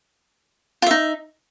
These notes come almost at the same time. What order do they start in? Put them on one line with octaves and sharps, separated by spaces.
F4 E5 D#4